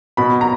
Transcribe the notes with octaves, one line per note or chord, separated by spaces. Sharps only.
B2 B5
A#5